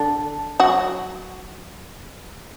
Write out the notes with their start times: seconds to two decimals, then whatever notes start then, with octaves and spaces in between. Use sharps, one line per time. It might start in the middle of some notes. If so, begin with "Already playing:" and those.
Already playing: D3 D4
0.60 F#3 F#4